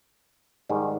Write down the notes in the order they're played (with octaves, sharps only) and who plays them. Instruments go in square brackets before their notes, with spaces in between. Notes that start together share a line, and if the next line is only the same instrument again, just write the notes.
[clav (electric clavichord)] G#2 D#3 G3